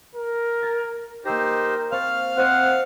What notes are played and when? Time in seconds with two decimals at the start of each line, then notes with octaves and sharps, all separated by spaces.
0.15 A#4
0.62 G#6 A6
1.25 A#3 D#4 G4 A#4 C5 E6 A#6
1.92 C4 F5 C#6 F6 A6
2.37 C4 C5 D#5 F#5